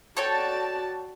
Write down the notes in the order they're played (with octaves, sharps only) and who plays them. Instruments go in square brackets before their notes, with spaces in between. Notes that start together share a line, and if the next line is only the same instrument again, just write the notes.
[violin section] F#4 D5 A5 [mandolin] A4 C#5 G5